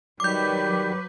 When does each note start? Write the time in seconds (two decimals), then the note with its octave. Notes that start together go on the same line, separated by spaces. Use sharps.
0.20 D#3 F#3 G3 B4 D6 G6